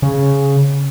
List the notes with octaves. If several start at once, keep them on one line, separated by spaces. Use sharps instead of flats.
C#3